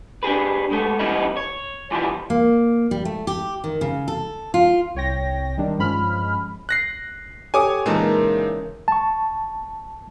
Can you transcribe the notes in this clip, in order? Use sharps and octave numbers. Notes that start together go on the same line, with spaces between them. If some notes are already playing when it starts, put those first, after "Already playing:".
D4 G4 G#4 B4
G#3 A3 B3
E3 G3 B3 C#4 D#4 E4
C#5
E3 F3 G3 B3 E4
A#3
G3
A3
G4
D#3
C#3
A4
F4
C2 C#5 G5 A#6
D#3 G3 D4
G2 F3 G#3 C#4 B5 F6
F#6 A#6 C7
G4 A4 C#5 G#5 D6 D#6
A#2 C#3 E3 G#3 D#4 A#4 A5
A5 C#6